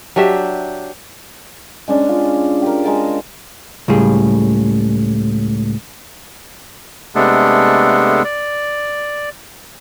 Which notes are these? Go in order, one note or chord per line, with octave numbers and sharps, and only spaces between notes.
F#3 D4 G4 E5
G#3 C#4 D4
F4
G4 A#4
G#3 A#4 A5
C#2 A2 G3 G#4
C3 G#3 A3 B3 D4 A4
D5